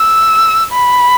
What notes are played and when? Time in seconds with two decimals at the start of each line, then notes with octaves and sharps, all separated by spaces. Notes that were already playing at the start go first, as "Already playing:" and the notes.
Already playing: E6
0.73 B5